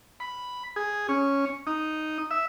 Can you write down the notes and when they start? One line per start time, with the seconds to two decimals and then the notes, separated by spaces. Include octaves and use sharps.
0.20 B5
0.76 G#4
1.09 C#4
1.67 D#4
2.31 E5